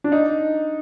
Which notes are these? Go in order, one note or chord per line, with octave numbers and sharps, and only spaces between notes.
D4
D#4